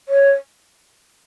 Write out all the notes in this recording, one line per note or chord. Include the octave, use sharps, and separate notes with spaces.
C#5